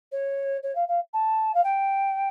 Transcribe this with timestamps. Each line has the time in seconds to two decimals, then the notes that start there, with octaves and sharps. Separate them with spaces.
0.12 C#5
0.63 C#5
0.75 F5
0.88 F5
1.13 A5
1.54 F5
1.64 G5